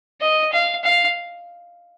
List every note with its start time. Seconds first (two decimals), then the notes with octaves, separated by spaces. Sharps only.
0.21 D#5
0.52 F5
0.84 F5